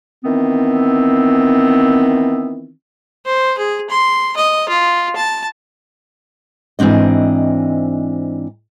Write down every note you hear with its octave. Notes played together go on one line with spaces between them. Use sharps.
D#3 E3 B3 C4
C5
G#4
C6
D#5
F4
A5
G#2 E3 C4 D4 D#5